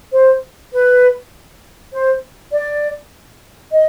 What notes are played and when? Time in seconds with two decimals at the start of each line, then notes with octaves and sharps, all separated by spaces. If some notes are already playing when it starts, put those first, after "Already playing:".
0.13 C5
0.73 B4
1.92 C5
2.53 D5
3.72 D#5